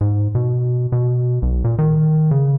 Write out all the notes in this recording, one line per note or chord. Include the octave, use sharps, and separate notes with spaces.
G#2
B2
B2
B1
A#2
D#3
C#3